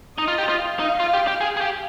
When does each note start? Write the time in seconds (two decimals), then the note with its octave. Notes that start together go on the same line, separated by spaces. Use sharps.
0.18 D#4 D#5
0.28 F4
0.38 G4
0.49 F4
0.59 F5
0.79 D#4
1.00 F4
1.13 G4
1.27 G4
1.41 G#4
1.57 G#4
1.61 G4